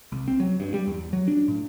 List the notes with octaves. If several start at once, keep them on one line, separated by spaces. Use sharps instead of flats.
C2
C4
F#3
G2
G3
E2
F#3
D4
A2